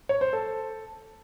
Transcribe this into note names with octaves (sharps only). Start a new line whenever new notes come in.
C#5
C5
A4